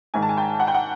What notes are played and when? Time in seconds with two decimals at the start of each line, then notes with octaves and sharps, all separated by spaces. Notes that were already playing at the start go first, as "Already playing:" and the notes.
0.14 G#2 D#3 G#3 G#5
0.22 A5
0.29 G#5
0.37 G5
0.60 F#5
0.67 G5
0.74 F#5